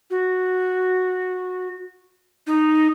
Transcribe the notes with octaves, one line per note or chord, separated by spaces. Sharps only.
F#4
D#4